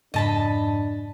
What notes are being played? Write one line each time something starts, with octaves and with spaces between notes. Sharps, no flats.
F2 G#2 C#3 D4 D#5 A5 B5